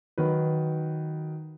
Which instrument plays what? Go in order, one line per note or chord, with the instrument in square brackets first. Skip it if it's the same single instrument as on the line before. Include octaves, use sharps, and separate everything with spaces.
[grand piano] D#3 F#3 B4